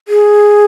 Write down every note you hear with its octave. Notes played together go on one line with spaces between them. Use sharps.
G#4